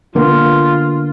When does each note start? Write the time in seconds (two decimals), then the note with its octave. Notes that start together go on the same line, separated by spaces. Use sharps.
0.15 D3 A#3 B3 F4